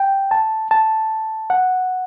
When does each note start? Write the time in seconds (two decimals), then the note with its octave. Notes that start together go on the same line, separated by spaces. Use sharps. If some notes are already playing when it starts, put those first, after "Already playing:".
Already playing: G5
0.31 A5
0.71 A5
1.50 F#5